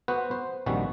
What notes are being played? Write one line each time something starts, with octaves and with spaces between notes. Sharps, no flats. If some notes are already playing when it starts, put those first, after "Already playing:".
B3 F#4 B4 C5
C5
A#1 C3 D#3 G3 F#4